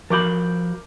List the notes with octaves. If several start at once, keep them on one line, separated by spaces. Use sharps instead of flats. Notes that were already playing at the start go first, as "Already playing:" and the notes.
F3 F#4 A#4 B5 D6 G6